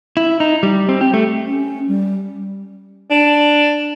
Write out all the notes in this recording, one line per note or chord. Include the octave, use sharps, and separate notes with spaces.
E4
D#4
G3
C4
G4
A3
C#4
G3
D4